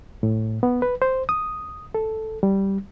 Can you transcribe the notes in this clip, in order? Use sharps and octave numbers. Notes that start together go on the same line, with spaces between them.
A2
B3
B4
C5
D#6
A4
G3